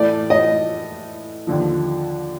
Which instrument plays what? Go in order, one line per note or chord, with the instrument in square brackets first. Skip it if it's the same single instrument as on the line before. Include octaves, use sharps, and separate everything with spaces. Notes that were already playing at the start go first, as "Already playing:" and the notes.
Already playing: [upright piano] A2 E3 A3 [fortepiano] D5
[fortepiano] D#5
[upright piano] D#2 D3 F3